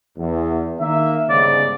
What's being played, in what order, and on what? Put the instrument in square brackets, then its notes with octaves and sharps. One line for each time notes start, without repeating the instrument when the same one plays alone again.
[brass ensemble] E2
D#3 A#3 E5
[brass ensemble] G1 G#2 C#3 [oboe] D5